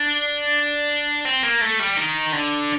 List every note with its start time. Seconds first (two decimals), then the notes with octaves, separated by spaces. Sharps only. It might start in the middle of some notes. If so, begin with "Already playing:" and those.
Already playing: D4
1.25 C4
1.43 A#3
1.61 A3
1.79 G3
1.97 D#3
2.33 D3